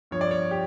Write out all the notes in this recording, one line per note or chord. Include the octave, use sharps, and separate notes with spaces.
G2 F3 C#5
D5
C#5
G4